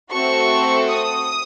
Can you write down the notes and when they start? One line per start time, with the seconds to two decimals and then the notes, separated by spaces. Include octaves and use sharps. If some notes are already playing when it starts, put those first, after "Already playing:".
0.11 A3 C4 F#4 A4 C#6
0.89 D#6